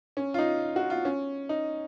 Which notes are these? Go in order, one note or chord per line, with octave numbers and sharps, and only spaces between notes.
C#4
F4
D#4
F#4
F4
C#4
D#4